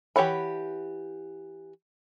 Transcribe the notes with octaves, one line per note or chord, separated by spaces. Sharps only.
E3 G4 C#5 F#5 B5